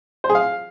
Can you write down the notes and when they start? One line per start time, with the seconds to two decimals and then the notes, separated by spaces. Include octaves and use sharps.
0.24 C5
0.29 G#4
0.35 F5